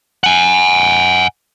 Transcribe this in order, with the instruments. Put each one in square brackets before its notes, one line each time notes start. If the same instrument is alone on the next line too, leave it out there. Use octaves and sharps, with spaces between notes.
[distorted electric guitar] F#5 G#5